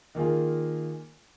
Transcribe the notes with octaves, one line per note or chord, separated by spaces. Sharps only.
D#3 A#3 F4 G#4